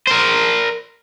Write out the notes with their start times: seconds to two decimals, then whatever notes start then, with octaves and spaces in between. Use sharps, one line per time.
0.07 A#4 C5